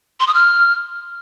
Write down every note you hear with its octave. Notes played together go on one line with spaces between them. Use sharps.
C6
D#6
F6